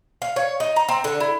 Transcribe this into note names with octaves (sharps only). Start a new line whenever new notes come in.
F5
C#5
D#4
A#5
C4
D3
E4